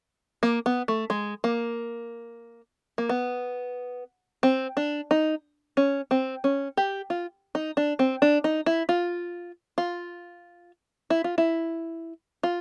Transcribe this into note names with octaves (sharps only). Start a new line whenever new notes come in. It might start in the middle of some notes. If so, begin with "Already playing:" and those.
A#3
B3
A3
G#3
A#3
A#3
B3
C4
D4
D#4
C#4
C4
C#4
G4
F4
D#4
D4
C4
D4
D#4
E4
F4
F4
E4
F4
E4
F4